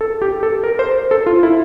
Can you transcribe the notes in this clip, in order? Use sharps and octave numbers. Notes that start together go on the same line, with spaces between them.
A4
G4
A4
A#4
C5
A4
F4
E4